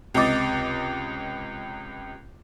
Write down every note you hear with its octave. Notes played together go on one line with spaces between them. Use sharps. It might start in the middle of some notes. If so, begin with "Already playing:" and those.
C#2 C3 D#5 D6 A6